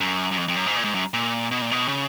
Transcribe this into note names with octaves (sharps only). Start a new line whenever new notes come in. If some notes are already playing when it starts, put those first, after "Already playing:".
F#2
F#2
F2
F2
F#2
G#2
A#2
G#2
F#2
A#2
B2
A#2
B2
C#3